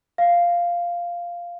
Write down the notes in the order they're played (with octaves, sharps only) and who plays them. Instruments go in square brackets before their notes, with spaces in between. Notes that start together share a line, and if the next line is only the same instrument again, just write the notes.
[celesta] F5